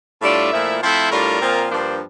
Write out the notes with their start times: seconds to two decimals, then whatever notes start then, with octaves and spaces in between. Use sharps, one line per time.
0.22 A2 G3 D4 F4 E5
0.52 A#2 F3 A3 E4
0.81 F3 A3 C4 E4 C5
1.11 A2 G3 D4 F4 A#4
1.41 A#2 F3 C4 F4
1.70 G2 F3 A#3 D4 C5